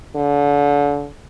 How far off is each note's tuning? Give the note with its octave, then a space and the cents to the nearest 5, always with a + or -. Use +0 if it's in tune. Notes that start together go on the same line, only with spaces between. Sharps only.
D3 -35